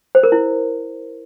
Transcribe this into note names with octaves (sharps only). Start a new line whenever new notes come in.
C5
A#4
E4